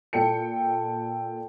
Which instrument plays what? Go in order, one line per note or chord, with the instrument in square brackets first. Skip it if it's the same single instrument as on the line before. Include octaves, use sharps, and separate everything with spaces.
[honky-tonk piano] A#2 A4 G5 C#7